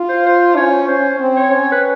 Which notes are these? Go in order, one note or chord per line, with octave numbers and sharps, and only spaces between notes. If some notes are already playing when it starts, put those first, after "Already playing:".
Already playing: F4
C5
C5
C#4 C#5
C#4 C5
C4
C#5
C#4
B4